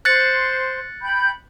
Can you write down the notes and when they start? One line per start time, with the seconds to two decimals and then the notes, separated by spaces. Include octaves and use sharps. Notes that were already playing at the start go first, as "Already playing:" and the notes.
0.05 C5 F#6 A6 C#7
1.02 G5 B5 G6